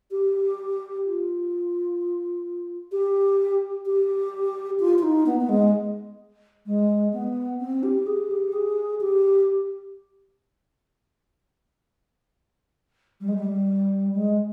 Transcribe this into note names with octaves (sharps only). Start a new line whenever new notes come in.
G4
F4
G4
G4
F4
F4
D#4
B3
B3
G#3
G#3
B3
C4
G4
G#4
G4
G#4
G4
G3
G#3
G3
G#3